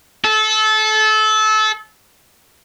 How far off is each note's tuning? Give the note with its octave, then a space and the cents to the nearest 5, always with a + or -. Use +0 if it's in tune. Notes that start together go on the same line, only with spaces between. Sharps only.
A4 -25